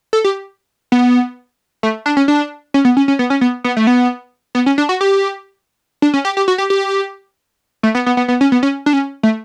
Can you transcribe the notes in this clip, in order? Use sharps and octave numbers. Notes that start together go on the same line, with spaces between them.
A4
G4
B3
A3
D4
C#4
D4
C#4
B3
C#4
C#4
B3
C#4
B3
B3
A3
B3
B3
C#4
D4
F#4
G4
D4
C#4
G4
G4
F#4
G4
G4
A3
B3
B3
B3
B3
C#4
B3
C#4
D4
C#4
A3